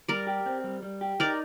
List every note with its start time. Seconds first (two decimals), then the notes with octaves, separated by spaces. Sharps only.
0.09 G3 A#4 D5
0.27 G4
0.46 C4
0.64 G3
0.83 G3
1.01 G4
1.20 D#4 A#4 D5